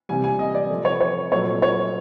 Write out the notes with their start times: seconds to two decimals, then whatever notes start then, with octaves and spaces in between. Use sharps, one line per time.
0.09 C3 E3 G3 G#5
0.24 G#5
0.39 D#5
0.55 D5
0.70 C3 F3 A3
0.85 C#5
1.00 C#5
1.31 A#2 F#3 A3 C#5
1.62 C#5